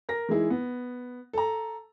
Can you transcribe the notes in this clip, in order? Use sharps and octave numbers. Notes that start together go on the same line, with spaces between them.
A#4 A#6
E3 G#3 D#4 E4 G#4
B3
A4 A#5